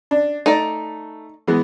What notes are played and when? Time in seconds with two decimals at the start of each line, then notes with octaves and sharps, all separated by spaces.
0.11 D4
0.46 A3 D#4 D5
1.47 E3 G#3 B3